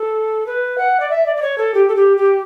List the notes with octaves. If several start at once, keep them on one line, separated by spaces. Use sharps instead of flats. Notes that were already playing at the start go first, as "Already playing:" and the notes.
Already playing: A4
B4
F#5
D5
E5
D5
D5
C#5
A4
G4
A4
G4
G4